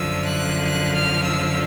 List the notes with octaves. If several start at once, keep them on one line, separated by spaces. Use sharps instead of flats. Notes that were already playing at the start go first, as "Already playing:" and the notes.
Already playing: F#2 D3 F3 E6
F#6
F#6
F6
E6